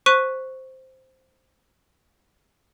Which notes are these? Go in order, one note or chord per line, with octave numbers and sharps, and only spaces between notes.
C5 C#6 F#6 B6 D#7